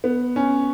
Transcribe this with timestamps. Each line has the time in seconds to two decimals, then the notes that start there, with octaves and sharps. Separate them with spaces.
0.04 B3
0.36 C#4